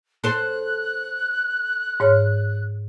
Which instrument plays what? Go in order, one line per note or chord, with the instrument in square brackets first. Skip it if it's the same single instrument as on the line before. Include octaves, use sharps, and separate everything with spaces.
[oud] A4 C5 [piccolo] F#6
[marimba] G#2 C#5 F6